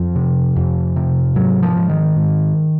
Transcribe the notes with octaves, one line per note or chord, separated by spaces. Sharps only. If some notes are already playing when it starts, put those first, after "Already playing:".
Already playing: F2 F3
C3
F2
C3
G#2 F#3
F3
G#2
D#3
G#2